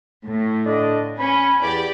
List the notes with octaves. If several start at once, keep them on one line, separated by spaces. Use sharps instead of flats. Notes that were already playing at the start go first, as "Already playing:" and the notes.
A2
D3 D4 D#5
C#4 B5
E2 G4 D5 B5